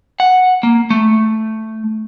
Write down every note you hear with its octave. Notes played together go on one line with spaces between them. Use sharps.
F#5
A#3
A3